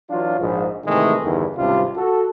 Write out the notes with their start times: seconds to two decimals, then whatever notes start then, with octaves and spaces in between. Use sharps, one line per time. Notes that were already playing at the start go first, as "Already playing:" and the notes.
0.10 E3 F#3 D4 F4
0.40 A#1 G#2
0.85 G#2 C3 D#3 E3 G#3 A3
1.22 E2 G2 D3 D#3
1.57 G#1 C#2 C3 G3 D4 F4
1.97 F#4 A4